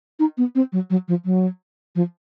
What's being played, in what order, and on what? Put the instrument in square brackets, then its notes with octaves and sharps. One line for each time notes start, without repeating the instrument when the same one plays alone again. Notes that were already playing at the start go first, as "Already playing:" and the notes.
[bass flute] D#4
B3
C4
F#3
F#3
F3
F#3
F3